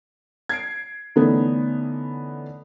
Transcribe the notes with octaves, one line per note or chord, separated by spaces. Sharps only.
G#6 C7 D7
D3 E3 A3 B3 C#4 D#4